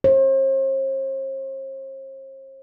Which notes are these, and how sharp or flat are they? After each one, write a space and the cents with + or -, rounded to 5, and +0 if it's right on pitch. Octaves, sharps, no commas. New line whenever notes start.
C5 +45